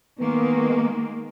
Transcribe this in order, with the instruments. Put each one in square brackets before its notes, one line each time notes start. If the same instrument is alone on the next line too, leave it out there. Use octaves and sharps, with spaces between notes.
[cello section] D#3 G#3 A#3 [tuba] B3